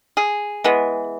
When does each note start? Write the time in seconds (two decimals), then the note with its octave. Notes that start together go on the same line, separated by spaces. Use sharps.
0.17 G#4
0.64 E3 G#3 B3